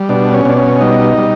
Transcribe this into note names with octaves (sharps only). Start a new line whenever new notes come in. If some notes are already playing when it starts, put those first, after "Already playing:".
Already playing: G3
B2 D4
C#4
B2 D4
C#4
G3 D#4
G3